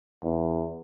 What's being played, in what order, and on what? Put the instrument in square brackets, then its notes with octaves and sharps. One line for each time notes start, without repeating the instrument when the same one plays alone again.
[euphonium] E2